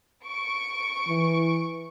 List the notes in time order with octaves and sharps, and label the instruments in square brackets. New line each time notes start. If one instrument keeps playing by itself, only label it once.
[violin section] C#6 D7
[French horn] E3